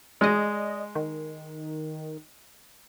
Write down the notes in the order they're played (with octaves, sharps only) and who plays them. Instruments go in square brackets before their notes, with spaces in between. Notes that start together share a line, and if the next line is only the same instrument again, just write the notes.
[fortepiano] G#3 [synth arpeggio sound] D5 D#5
[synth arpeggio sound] D#3